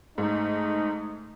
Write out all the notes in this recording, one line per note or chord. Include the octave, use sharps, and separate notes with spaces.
G#2 A3 D#4